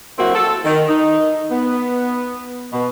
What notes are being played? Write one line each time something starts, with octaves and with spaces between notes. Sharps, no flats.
F#3 A#3 C4 E4 F#4
A4
D#3
D#4
B3
B2